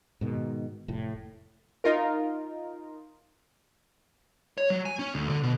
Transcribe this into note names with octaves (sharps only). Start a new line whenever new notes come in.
G#2 B2 D#3
F1 A2
D#4 F4 A#4
C#5
F#3
G#5
C#4
D2
D3
B2